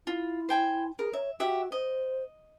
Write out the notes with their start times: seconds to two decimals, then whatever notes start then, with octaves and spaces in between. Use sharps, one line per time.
0.07 E4 F4
0.49 C5 G5 G#5
0.99 G#4 A#4
1.13 C#5 E5
1.40 F#4 G4 E5 F#5
1.72 C5 D#5